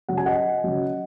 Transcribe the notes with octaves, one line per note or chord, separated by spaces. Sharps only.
C#3 F#3 F#5
G#5
D#5 F#5
C#3 F#3